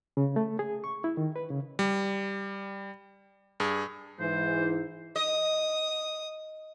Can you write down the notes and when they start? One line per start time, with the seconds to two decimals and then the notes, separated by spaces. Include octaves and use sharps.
0.17 C#3
0.36 A3
0.59 G#4
0.84 C#6
1.04 E4
1.17 D#3
1.36 B4
1.51 C#3
1.79 G3
3.60 G2 G#4
4.20 G#2 E3 C5
5.16 D#5 D#6